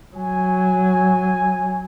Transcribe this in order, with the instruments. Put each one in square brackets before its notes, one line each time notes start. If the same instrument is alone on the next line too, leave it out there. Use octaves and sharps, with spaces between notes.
[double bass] F#3 [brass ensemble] G#5